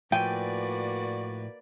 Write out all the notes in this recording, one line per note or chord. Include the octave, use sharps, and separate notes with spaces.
A2 F3 A#3 F#4 B4 D5 G5 G#5